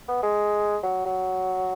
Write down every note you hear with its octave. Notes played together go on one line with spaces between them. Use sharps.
B3
G#3
F#3
F#3